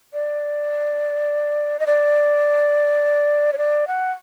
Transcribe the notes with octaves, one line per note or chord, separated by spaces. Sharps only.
D5
D#5
D5
C#5
D5
F#5